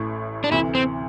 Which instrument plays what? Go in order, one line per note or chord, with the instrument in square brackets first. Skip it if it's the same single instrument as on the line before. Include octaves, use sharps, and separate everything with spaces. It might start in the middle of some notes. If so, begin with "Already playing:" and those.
Already playing: [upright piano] A1 A2 E3 A3
[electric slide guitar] D4
[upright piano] D2 C3 E3 [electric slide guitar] E4
[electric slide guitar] C4